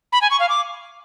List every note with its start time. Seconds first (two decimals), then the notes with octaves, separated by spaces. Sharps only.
0.13 B5
0.22 G#5
0.31 C#6
0.40 F5
0.49 D6